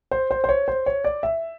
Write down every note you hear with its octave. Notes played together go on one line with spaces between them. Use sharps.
C5
C5
C5
C#5
C5
C#5
D5
E5